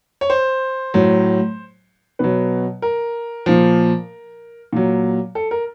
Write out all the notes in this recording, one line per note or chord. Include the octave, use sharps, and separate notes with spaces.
C#5
C5
A2 F#3
B2 F#3 B4
A#4
A#2 F3
A#2 F#3
A4
A#4